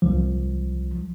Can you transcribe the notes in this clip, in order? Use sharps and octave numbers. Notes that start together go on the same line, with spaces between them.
C2 F3